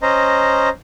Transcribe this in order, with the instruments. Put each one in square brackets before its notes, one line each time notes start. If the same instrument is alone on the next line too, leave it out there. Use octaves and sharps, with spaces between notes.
[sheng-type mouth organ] C#4 C5 D#5 A#5